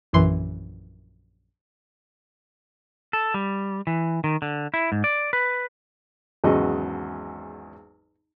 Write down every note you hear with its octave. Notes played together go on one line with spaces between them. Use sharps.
A#1 F#2 E3 C6
A4
G3
E3
D#3
D3
E4
G#2
D5
B4
G#1 E2 C#3 F#3 F#4 D#5